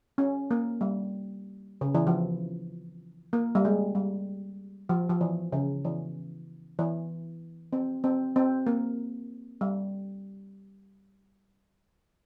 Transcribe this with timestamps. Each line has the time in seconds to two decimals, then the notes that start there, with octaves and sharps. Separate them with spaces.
0.18 C#4
0.51 A#3
0.81 G3
1.81 C#3
1.95 E3
2.07 F3
3.33 A#3
3.55 G3
3.65 G#3
3.95 G3
4.89 F3
5.10 F3
5.21 E3
5.52 C#3
5.85 E3
6.79 E3
7.73 C4
8.04 C4
8.36 C4
8.67 A#3
9.61 G3